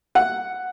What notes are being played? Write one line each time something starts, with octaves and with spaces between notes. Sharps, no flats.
F#5